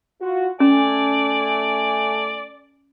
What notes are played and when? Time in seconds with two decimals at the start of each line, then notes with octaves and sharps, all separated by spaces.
0.21 F4 F#4
0.60 A3 C#4 D5 G#5